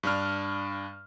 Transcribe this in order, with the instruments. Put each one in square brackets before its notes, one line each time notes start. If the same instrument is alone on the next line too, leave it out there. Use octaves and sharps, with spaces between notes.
[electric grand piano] G2 D4 F6